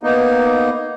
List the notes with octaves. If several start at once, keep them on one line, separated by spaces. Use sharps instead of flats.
A#3 B3 D#4